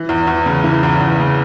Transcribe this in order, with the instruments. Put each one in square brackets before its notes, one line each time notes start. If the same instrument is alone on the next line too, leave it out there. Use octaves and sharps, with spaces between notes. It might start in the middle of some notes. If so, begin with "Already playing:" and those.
Already playing: [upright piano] E3
E2
E2
C#3
E3
E2
E2
C#3